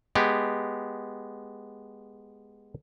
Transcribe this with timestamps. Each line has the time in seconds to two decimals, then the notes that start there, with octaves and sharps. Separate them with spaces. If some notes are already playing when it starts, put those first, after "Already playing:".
0.15 G#3 B3 G4